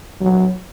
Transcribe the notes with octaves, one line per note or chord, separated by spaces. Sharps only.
F#3